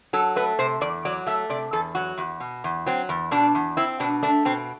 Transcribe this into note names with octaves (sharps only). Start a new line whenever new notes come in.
F#3 A4
A3 B4
C3 C5
E2 D5
F#3 D5
A3 E5
C3 D5
E2 A4
F#3 F#4
E2
B2
E2
F#3 C4
E2
B2 D4
E2
C4 E4
B2 D4
A3 D4
B2 C4